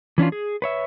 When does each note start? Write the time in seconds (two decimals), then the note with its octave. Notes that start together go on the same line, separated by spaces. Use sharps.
0.18 E3 C#4 D4 F4
0.32 G#4
0.62 B4 C#5 E5